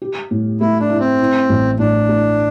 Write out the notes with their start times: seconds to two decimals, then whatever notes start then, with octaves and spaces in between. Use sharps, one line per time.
0.02 G4
0.31 A2
0.60 A3 E4
0.80 D4
0.90 E4
1.00 C4
1.19 E4
1.49 A1
1.79 A2 D4
2.09 A3